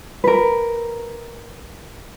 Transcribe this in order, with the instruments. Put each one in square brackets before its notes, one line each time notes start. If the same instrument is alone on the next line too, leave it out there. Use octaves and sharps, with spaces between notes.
[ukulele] A#4 B4